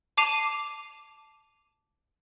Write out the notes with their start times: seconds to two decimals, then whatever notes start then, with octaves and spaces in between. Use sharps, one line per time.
0.17 A5 D6 C7 D#7 F7